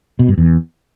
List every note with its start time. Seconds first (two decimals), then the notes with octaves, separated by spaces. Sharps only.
0.19 B2
0.28 G2
0.38 E2